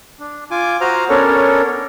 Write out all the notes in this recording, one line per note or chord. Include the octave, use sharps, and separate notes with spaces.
D4
F4 G#5 D6
F#4 C5 A#5 D#6 F6
B3 C#4 D4 A4 A#4 C#5